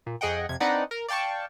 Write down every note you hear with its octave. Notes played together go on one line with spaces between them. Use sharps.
A#2
F2 G#4 D#5 F#5 G5
F2 C3 G#6
C4 D4 D#4 B4 D5 F#5
A#4
D5 F5 G5 A5 C#6